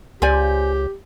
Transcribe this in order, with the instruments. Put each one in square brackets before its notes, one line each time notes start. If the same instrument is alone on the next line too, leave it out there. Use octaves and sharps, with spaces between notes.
[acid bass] C#2 [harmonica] G4 [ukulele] C5 D5 G#5